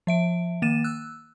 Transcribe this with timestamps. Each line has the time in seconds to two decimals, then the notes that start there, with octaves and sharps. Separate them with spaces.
0.07 F3 E5 D7
0.62 D#3 A#3 A6 D#7 E7
0.84 E6 F#6